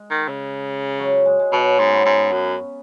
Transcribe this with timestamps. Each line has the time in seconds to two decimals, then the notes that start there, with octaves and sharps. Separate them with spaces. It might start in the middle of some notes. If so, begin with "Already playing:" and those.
Already playing: G#3
0.10 D#3
0.28 C#3
0.99 F#3
1.26 G#3
1.39 G#3
1.52 B2 F#3
1.79 G#2 B3
1.87 C#4
1.93 B3
2.05 G#2
2.32 F#2